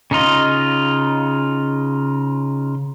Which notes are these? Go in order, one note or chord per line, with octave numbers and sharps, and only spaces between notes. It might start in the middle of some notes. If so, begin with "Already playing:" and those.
C#3 D#4 F4 D#5